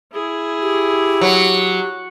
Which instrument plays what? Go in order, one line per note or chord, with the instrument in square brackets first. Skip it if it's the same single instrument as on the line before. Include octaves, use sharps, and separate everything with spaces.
[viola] E4 G#4
[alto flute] G4
[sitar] F#3